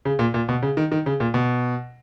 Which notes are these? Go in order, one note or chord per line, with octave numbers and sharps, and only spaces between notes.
C#3
A#2
A#2
B2
C#3
D#3
D#3
C#3
A#2
B2